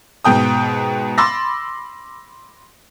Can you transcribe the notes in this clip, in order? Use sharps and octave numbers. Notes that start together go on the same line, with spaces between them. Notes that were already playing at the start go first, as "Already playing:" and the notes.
G#2 B2 G5 D#6
B5 C6 D6 E6 A6 A#6